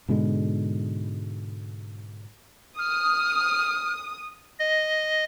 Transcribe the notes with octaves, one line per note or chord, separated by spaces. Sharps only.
G#2 B2 D3 G#3
D#6 F6
D#5